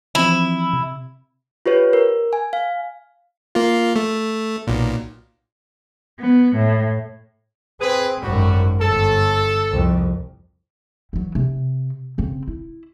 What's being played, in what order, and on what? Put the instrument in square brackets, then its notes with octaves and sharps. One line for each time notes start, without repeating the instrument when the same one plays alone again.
[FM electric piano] E3 F3 C4 [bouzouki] E4
[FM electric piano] C3
[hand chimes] F4 G4 B4 C#5
A#4
G#5
F5
[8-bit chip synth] A#3 F4
A3
B1 A#2
[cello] B3
A2
[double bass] C4 [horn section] G#4 B4
[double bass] G#1 F#2 [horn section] A2 G3 F#4
[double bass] G1 [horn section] A4
[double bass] C2 F2
[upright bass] E3 F#3
C3
C#3 C4
E4